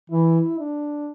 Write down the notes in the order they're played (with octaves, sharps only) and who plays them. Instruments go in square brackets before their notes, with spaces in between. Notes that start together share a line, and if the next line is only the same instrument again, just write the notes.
[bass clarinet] E3 [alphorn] E4
[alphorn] D4